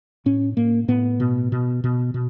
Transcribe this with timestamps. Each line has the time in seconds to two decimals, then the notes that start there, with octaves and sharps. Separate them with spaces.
0.26 A2 C#4
0.57 A2 A#3
0.88 A2 B3
1.20 B2
1.52 B2
1.84 B2
2.14 B2